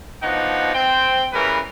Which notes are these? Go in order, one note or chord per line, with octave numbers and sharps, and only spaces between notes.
B2 F3 D4 D#4 F#5
C4 G5
C#3 E3 G3 A#4 B4